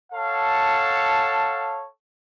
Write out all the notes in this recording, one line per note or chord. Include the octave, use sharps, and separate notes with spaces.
A4 C#5 F5 F#5 A5